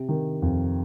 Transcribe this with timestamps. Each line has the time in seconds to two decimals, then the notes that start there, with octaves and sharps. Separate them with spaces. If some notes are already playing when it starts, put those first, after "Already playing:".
Already playing: C3
0.09 D#3
0.42 F2